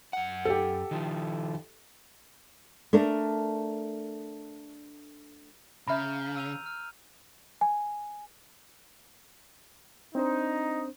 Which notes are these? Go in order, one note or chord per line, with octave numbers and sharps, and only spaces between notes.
F#2 F#5
G4 A4
D#3 F3
A3 D4 A#4
C#3 E5 A#5 B5 F6 G6
E6 D#7 F7
F6
G#5
C4 D4 D#4 C5